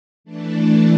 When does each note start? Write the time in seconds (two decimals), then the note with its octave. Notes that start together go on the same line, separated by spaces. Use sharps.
0.24 E3 A3 D4 A4